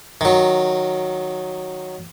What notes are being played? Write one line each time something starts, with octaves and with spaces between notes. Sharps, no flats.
D#3 F#3